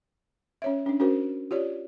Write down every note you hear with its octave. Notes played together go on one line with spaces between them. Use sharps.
C#4 C#5 E5
C#4 D4
C#4 F#4 A#4 C5
F4 G4 C#5 D5